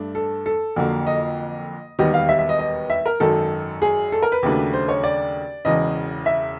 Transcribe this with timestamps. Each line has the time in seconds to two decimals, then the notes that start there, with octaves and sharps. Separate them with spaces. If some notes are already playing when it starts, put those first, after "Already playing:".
Already playing: G2 A3 D4
0.15 A4
0.46 A4
0.76 F2 D3 F#3 A#3
1.07 D#5
1.99 E1 D#2 D#3 G3 B3 D#5
2.14 F5
2.29 E5
2.39 E5
2.49 D#5
2.59 D#5
2.90 E5
3.06 A#4
3.20 G#1 F#2 D#3 A4
3.82 G#4
4.12 A4
4.22 A#4
4.32 B4
4.43 D#2 C#3 F#3 A3 D4
4.73 C5
4.89 C#5
5.04 D5
5.65 E1 E2 C#3 D#5
6.26 E5